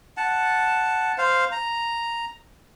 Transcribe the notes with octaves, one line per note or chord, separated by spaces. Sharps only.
F#5 A5
C5 F5
A#5